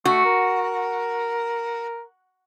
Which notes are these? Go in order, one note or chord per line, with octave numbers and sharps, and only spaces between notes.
A3 F#4
A#4